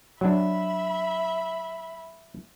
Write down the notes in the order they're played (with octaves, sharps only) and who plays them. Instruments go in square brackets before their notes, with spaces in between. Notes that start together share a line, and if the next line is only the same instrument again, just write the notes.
[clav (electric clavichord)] F#3 D4 [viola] E5 B5